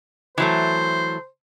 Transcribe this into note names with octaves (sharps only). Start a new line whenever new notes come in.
E3 F#3 A3 C5